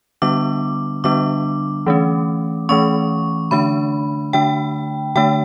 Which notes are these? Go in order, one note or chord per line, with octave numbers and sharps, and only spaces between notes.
D3 G3 B3 D4 D6
D3 G3 B3 D4 D6
E3 A3 C#4
E3 A3 C#4 C#6
D3 A3 D4 B5
D3 A3 D4 G5
D3 A3 D4 G5